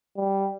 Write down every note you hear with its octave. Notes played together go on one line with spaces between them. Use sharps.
G3